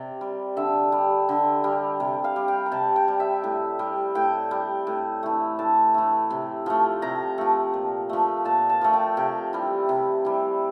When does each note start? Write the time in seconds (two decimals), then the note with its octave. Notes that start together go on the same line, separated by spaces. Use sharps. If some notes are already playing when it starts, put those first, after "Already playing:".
Already playing: C3 D5
0.21 G3
0.57 D3 E5
0.92 G3
1.29 D3
1.64 G3
2.00 C3
2.24 F5
2.36 G3
2.48 G5
2.66 A#5
2.72 C3 A5
2.96 G5
3.08 G3
3.20 E5
3.44 A2
3.79 G3
4.15 A2 G5
4.51 G3
4.87 A2
5.23 E3 A3
5.59 A2 A5
5.94 E3 A3
6.30 C3
6.66 F3 A3
7.02 C3 A#5
7.38 F3 A3
7.74 A#2
8.09 F3 A3
8.45 A#2 A5
8.69 A5
8.81 F3 A3
8.93 G5
9.17 C3 G5
9.53 E3 G3
9.89 C3
10.25 E3 G3